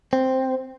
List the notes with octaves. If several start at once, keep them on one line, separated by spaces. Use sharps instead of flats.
C4